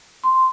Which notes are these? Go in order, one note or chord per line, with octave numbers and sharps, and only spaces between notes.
C6